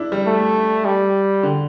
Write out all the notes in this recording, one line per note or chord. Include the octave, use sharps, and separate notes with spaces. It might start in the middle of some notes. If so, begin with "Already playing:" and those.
Already playing: D4 E4
G3
A3
G3
D3